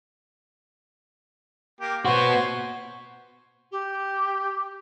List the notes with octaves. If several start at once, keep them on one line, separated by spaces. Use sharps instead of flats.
A#3 G4
B3 F#4 C5 C#5
G4